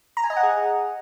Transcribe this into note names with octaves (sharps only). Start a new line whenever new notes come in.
A#5
G#5
D#5
F#5
G#4